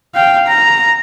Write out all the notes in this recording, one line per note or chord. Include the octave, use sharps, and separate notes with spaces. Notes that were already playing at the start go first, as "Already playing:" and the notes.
F5 G5
A#5